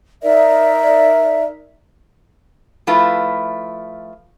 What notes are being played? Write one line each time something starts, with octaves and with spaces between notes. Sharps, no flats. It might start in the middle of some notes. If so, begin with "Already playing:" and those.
D#4 A#4 D5 E5
F3 A3 E4 F4 B4